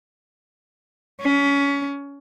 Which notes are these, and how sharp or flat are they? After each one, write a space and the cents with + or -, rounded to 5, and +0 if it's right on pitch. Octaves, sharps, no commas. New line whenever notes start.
C#4 +25